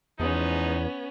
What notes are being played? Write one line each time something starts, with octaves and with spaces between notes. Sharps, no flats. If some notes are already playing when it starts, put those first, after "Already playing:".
E2 F3 G#3 B3 C#4 D#4